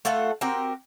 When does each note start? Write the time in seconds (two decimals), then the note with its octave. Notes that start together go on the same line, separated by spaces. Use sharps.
0.05 A3 F4 A4 F#5
0.41 C4 F#4 G4 A#4